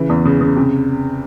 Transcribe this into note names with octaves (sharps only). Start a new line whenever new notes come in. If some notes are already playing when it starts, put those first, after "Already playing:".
Already playing: C#3 E3
E2
C#3
C#3
C3